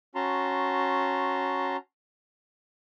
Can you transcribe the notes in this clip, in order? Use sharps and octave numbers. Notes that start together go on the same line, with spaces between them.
C#4 F#4 A5 A#5 C6